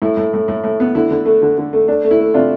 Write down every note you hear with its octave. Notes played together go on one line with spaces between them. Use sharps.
A2 E4
A2
A2
A2
A2
B3
D3 E4
D3
A3
D3
D3
A3
A3 D4
A3
E4
A3
C3 D4 F4